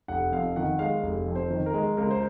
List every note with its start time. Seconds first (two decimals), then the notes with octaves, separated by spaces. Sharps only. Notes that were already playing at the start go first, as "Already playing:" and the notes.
0.08 F1 F#5
0.32 F2 F5
0.56 D#3 F#5
0.79 G#3 F5
1.03 F1
1.27 F2
1.35 C5
1.50 D#3
1.66 A#4
1.74 G#3
1.97 C#2 A#4
2.11 C5